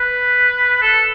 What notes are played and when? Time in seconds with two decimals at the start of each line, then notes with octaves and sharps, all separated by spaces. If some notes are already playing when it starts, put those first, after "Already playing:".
Already playing: B4
0.82 A4